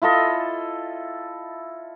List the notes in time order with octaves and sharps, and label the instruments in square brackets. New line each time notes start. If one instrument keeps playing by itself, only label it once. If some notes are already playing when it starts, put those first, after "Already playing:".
[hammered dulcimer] E4 F4 A4 D#5